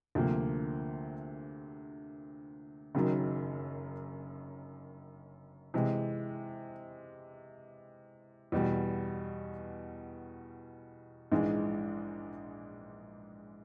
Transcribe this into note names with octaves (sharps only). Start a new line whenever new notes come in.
D2 C3 F3 A#3
F#1 F#2 D#3 F#3
C3 E3 G#3
E2 B2 G3
A#1 G#2 E3 G#3